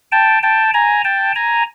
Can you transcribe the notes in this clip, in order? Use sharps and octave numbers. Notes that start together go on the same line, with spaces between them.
G5 A5
G5 A5
G#5 A#5
G5 A5
G#5 A#5